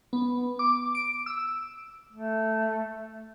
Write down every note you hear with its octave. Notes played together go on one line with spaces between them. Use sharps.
B3
D6
D7
E6
A3